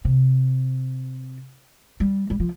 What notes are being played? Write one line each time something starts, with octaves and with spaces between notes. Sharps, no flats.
C3
G3
G3
F3